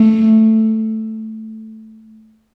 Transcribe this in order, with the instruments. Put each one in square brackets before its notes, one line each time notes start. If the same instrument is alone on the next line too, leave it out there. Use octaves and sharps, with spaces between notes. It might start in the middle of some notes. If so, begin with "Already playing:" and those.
Already playing: [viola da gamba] A3